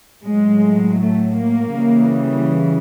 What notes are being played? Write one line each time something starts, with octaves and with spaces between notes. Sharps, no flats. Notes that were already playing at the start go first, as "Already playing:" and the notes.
A2 F#3 G#3
A3
A#3
C#3 E3 G3